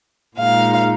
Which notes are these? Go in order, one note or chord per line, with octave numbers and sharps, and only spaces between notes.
A#2 G#3 D#4 F5